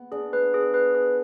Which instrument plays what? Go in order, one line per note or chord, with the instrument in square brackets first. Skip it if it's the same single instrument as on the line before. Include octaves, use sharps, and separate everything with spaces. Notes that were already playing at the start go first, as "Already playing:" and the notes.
Already playing: [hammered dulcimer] B3
[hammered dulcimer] D4 [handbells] G#4
[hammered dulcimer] B3 [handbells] B4
[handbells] G#4
B4
G#4